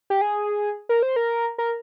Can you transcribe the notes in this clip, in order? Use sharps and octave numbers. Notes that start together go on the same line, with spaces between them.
G4
G#4
A#4
C5
A#4
A#4